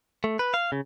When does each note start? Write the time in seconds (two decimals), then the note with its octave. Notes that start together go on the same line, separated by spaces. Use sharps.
0.24 A3
0.39 B4
0.54 F5
0.72 C#3